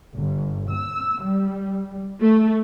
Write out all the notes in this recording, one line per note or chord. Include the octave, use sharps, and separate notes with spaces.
G1
E6
G3
A3